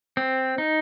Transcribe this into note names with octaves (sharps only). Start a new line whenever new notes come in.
C4
D#4